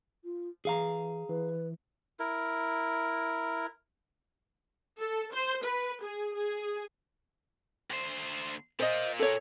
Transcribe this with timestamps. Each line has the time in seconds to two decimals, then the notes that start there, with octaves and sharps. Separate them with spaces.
0.24 F4
0.65 E3 G#4 F5 A#5
1.29 E3 B4
2.19 E4 A#4
4.99 A4
5.33 C5
5.63 B4
6.04 G#4
6.37 G#4
7.90 D2 C5
8.79 A#2 A#3 C5 D#5
9.19 A4 C#5